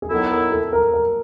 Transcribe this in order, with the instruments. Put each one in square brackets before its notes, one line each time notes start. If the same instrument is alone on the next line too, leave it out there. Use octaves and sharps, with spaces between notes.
[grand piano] G#4
[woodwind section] D#3 F#3 B3 E4 [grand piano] A4
[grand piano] A#4
A4
A#4
A#4